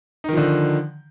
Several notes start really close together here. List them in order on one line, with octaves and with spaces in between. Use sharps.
D#4 D#3 F3 D3